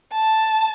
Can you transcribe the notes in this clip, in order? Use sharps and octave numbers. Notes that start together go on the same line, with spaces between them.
A5